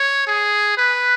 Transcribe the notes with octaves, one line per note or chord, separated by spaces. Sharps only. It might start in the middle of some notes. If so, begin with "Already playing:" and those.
Already playing: C#5
G#4
B4